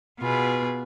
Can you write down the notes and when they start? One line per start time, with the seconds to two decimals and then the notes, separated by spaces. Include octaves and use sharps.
0.19 B2 B3 F4 G#4 B4